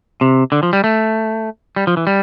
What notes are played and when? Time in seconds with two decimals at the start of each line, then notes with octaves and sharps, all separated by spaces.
0.21 C3
0.52 D3
0.63 F3
0.73 G3
0.84 A3
1.76 G3
1.87 F3
1.97 E3
2.07 G3